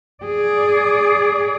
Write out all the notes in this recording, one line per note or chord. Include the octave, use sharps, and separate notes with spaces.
G#4 D5